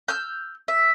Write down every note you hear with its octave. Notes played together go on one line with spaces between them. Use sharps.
E6 F6 G6
E5